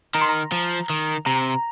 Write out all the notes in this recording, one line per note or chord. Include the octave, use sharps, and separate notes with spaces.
D#3 A#5
C6
A#5
F3
D#3
C3 A#5